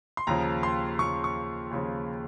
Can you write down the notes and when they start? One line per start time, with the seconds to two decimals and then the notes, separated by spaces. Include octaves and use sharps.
0.17 C6
0.27 D#2 C#3 F3 A#5
0.63 C6
0.99 D#2 C#3 F3 C#6
1.24 C#6
1.71 D#2 C#3 F3